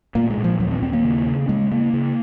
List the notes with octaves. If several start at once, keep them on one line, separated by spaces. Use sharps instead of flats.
A#2 A#3
G#3
A#2
F3
D#2 F#3
C4
D#2 C4
A#3
C#3
C#3
C#3 G#3
C#3 A#3
C#3